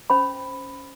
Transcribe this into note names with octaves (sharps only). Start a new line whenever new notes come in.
C#4 C5 B5